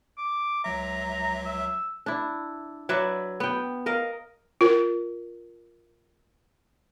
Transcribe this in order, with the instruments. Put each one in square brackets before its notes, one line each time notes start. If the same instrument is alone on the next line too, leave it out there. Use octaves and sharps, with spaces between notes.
[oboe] D6
[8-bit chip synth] C#2 F#3 E5 [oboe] A#5
[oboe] E6
[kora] D4 E4
F#3 B4 D5 E5
B3 G5
A#4 D#5 F5
[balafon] F4 A#4